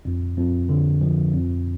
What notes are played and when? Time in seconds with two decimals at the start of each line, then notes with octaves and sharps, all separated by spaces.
0.05 F2
0.37 F2
0.69 D3
1.01 F3
1.33 F2